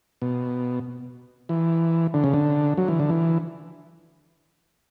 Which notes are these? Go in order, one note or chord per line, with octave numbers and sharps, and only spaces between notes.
B2
E3
D3
C#3
D3
F#3
E3
D3
E3